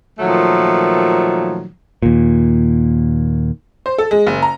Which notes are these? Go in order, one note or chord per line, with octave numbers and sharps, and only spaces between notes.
A#2 D#3 F3 F#3 A3
D#2 A#2
C5
A4
G#3
F#1
A#5